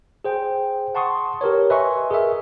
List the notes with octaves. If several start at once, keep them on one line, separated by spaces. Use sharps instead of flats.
G#4 C5 G5
F#5 A5 C6 C#6 D#6
G4 A#4 B4 C#5
B4 D#5 E5 G#5 C6 C#6
G#4 A#4 E5